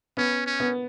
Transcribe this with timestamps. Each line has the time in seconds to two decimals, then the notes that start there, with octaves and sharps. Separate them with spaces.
0.17 B3 C#4
0.46 C#4
0.60 B3